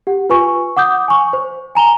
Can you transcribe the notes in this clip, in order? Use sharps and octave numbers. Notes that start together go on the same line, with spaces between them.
G4 F#5
F4 B4 G#5 C#6
F#5 D6 D#6 G6
G#5 C#6
C5
G#5 A#5 F7 G7